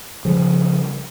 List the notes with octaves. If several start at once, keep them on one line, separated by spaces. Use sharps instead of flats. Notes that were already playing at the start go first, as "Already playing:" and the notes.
C#3 F3 G3